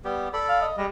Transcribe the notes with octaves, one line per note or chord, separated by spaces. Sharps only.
G3 B3 G4
A4 D5 B5
F5
D#5
G3 G#3 D#5